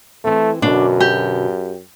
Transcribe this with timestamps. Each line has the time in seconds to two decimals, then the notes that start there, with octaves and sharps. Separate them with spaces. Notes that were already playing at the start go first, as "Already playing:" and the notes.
0.24 E3 A3 C4
0.62 F#2 B2 D3 D4 F#4
1.00 G4